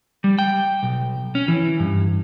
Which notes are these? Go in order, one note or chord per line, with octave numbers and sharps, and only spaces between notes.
G3
G5
B1
C#4
E3
G2